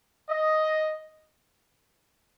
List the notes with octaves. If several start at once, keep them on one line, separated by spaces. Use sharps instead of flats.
D#5